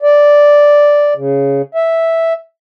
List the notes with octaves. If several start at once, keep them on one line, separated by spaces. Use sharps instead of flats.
D5
C#3
E5